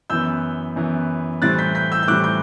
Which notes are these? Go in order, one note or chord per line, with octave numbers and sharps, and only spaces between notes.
F#2 E3 B3 E6 G6
F#2 E3 B3
A2 E3 G3 C4 F#6 A6
G6 B6
G6 B6
E6 G6
G6
A2 E3 G3 C4 D6 F#6
G6